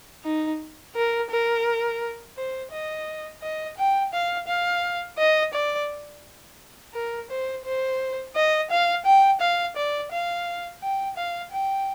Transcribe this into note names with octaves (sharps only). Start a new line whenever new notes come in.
D#4
A#4
A#4
C5
D#5
D#5
G5
F5
F5
D#5
D5
A#4
C5
C5
D#5
F5
G5
F5
D5
F5
G5
F5
G5